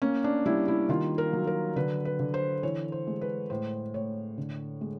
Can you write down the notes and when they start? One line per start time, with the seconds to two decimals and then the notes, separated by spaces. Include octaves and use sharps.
0.02 A#3 C#4
0.24 D4
0.46 G3 E4
0.68 E4
0.89 D#3 F4
1.18 A#4
1.33 F#3
1.47 A#4
1.76 D3 B4
2.05 B4
2.19 D3
2.34 C5
2.63 E3 C#5
2.92 C5
3.07 G#3
3.21 B4
3.50 A2 C5
3.94 A2 C#5
4.38 D3
4.81 G#3